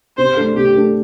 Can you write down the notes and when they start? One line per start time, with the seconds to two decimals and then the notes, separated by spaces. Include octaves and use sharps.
0.18 C3 C5
0.37 A3 D4 A4
0.56 C3 G4
0.74 A3 D4 A4